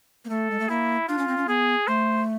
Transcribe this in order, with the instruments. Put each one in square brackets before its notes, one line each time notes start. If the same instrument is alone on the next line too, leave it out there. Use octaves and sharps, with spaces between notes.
[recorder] A#3
[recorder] A3 [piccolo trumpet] A4
[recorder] G#3
A3
[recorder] A#3 [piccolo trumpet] E4
[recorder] D4 [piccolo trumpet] F4
[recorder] C#4
C4
C#4
[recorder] B3 [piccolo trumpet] G#4
[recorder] A3 [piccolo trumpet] C5